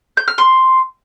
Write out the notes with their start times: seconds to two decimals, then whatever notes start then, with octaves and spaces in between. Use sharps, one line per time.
0.17 G6
0.28 F6
0.38 C6